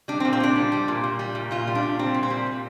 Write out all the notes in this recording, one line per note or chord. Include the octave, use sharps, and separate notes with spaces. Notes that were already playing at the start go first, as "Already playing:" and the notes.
G3 D4
C4
A#2
C4
A#2 D4
G3
G3
A#2
A#2
G3
A#2
A#2 F4
G3
D4
A#2
G3 C4
A#2
C4
G3
A#2